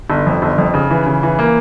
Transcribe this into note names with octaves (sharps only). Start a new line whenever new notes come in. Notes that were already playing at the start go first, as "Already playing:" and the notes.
G1
F2
G1
F2
C#3
E3
C#3
E3
A#3